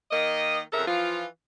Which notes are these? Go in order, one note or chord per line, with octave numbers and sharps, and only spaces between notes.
D#3 A#3 D#5
F2 C#3 A4 A#4 E5
E3 F3 F4